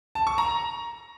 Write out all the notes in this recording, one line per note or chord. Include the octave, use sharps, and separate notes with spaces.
A5
C#6
A#5